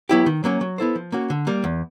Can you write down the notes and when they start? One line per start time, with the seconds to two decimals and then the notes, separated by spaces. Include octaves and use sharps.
0.09 F#3 B3 E4 G4
0.26 D#3
0.44 F#3 A#3 C#4
0.61 F#3
0.78 B3 E4 A4 C5
0.95 F3
1.12 A#3 C#4 F#4
1.30 D3
1.47 G3 A#3
1.64 E2